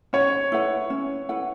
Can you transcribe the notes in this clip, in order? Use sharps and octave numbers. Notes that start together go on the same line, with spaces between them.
C#4 C#5
E4 B4 F#5
C#4
E4 B4 F#5